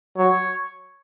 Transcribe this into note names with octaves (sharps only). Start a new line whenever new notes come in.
F#3 C#5